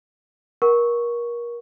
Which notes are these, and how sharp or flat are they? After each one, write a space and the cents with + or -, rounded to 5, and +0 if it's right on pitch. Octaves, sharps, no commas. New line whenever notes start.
A#4 +30 F#5 +0 C#6 +0